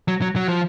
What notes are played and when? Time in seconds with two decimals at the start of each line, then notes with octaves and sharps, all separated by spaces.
0.08 F#3
0.22 F#3
0.36 F#3
0.48 F3